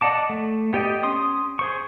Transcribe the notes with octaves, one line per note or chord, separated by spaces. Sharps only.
D5 D#5 F#5 A5 D6
A3
B3 G4 D5 D#5 G5
C#4 C6 D#6
G#4 C5 C#6